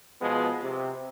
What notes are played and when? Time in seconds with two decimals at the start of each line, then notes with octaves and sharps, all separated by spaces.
0.22 B2 F3 G#3 B3
0.62 C3